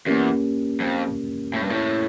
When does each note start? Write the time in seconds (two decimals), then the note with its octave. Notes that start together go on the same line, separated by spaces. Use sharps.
0.06 E2 A#3 C#4 G4 A#4
0.80 F2
1.54 A2
1.62 G2
1.70 A2